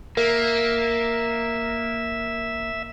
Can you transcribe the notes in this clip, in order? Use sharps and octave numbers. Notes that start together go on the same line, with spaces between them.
A#3 A#4 E5